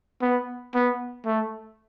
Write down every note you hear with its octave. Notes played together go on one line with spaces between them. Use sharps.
B3
B3
A3